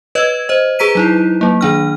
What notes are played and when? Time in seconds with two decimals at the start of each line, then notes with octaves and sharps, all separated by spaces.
0.15 B4 C#5 D#5 E6 G#6
0.49 C5 D#5
0.79 G#4 B4 A#5 B6 D#7
0.95 F#3 D#4 E4
1.41 F#3 A#3
1.61 D#3 D4 F6